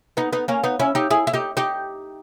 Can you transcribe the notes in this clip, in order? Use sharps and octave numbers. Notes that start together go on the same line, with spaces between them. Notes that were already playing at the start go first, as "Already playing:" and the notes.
B3 D#4
B3 D#4
A#3 C#4
B3 D#4
C#4 E4
D#4 G4
E4 G#4
E4
D#4 G4
D#4 G4